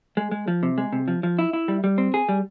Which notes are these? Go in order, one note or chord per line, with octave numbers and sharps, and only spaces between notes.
G#3
G#3
F3
C3
G#3
C3
F3
F3
E4
E4
G3
G3
C4
G#4
G3